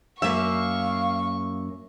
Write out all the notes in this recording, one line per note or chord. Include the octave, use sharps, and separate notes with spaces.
F#2 A#3 E5 F5 C#6